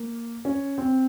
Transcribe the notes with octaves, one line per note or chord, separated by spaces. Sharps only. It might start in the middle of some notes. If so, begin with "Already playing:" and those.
Already playing: A#3
C#4
C4